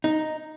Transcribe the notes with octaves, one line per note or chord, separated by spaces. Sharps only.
D#4